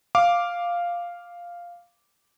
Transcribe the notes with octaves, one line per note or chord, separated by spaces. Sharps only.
F5 D6